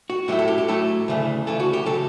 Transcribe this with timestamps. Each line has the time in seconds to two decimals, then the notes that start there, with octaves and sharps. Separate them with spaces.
0.10 F#4
0.28 A2 F#3 A3 E4 G4
0.39 A4
0.48 G4
0.58 G4
0.68 A2 F#3 A3 E4 A4
1.08 D2 C#3 E3 A3
1.47 D2 C#3 E3 A3 A4
1.60 F#4
1.73 G4
1.86 C#3 F#3 A4